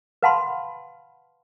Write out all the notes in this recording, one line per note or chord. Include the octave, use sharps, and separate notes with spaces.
B4 F5 F#5 A5 B5 C6